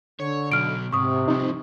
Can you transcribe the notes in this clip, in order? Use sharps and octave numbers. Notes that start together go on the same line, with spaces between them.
D3 C#5
B2 F#3 F6 D7
G#2 C3 C#6 D#6
C2 F3 C4 D#4